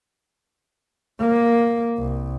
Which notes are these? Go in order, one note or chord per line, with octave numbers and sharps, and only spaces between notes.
A#3
C2